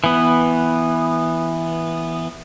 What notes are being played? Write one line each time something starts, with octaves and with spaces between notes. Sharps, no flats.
E3 B3